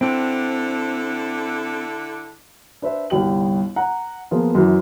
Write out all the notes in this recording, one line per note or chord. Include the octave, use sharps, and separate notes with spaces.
D3 C4 D4 E4
D4 B4 C5 E5
G1 C2 G4 F#7
F#5 A#5
F3 A#3 B3 F4 G#4
F#2 E3